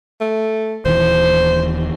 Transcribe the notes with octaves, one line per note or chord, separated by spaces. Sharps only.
A3
D#1 D#2 E3 C5